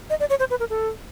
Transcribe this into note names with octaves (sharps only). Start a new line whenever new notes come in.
D#5
D5
C#5
C5
B4
A#4
A4